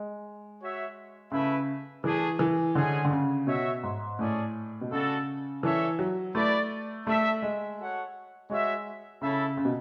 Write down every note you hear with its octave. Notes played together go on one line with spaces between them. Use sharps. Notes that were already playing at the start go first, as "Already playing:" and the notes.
Already playing: G#3
F#4 C#5 E5
C#3 A3 E4 B4 E5
E3 A3 D4 G#4
E3
D3 G#3 C#4 G#4
D3
C#3
B2 F#4 C#5 E5
G#2
A2 A3 C#4 G#4 D5
B2
C#3 D4 F#4 A4
E3 D4 A4 C#5 E5
F#3
A3 E4 B4 D5
A3 D4 A4 E5
G#3
F#4 A4 C#5 F#5
G#3 F#4 C#5 E5
C#3 C#4 E4 A4 E5
C#3
B2